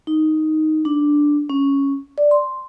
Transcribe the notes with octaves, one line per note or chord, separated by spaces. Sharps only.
D#4
D4
C#4
D5
C6